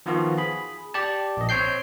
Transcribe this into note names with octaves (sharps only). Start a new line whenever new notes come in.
D#3 F3 B3 F4 F#4
G#4 B5
G4 D5 A5
A#1 D#5
C4 C#5 G5 G6 C7